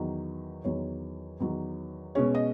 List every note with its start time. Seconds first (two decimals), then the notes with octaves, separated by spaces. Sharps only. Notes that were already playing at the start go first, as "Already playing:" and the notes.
Already playing: E2 D#3 F#3
0.64 E2 D#3 F#3 C#5
1.40 E2 D#3 F#3
2.15 B2 G#3 C#4 C#5
2.35 D#5